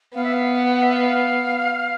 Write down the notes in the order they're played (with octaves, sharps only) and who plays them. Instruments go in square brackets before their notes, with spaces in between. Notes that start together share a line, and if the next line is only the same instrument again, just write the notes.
[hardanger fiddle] B3 [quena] F5
[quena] E5
F5
F#5
E5
F5